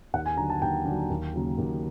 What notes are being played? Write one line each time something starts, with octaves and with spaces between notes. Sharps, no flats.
D#2 F#5
G#5
D3 F#3 A#5
A5
D#2 G5
D3 F#3
D#2
C#3 F#3 A#3
D#2